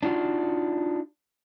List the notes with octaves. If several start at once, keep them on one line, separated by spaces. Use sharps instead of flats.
D4 D#4 F4 F#4